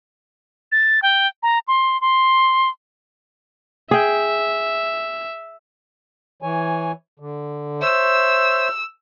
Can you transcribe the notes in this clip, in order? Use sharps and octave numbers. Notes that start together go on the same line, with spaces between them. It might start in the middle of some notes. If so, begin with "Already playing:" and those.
A6
G5
A#5
C6
C6
G#4 E5 G5
E3 C#5 G#5
D3
C5 C#5 E5 E6